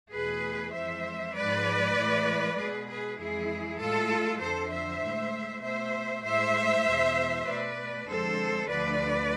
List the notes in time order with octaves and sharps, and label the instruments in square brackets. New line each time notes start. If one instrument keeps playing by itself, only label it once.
[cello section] E2 B2 A3 G#4 B4
F2 E3 G#3 C5 E5
G#2 F3 G#3 B4 D5
A2 E3 G#3
B2 G#3 G#4 B4
G#4 B4
F2 E3 G#3 E4 G#4
A2 G#3 F4 A4
F2 D3 F3 A4 C5
C5 E5
A2 G#3
B2 A3 C5 E5
A2 G#3 C5 E5
E2 B2 G#3
B2 A3 B4 D5
F2 D3 G#3 A4 C5
D2 D3 F3 B4 D5